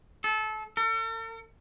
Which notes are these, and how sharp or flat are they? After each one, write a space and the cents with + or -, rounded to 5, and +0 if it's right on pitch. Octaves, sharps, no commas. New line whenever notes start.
A4 -25
A4 +45